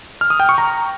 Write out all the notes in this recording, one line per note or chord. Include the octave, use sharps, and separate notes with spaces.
F6
D#6
G5
C#6
A#5